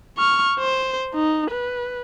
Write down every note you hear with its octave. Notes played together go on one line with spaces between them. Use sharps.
C#6 F6
C5
D#4
B4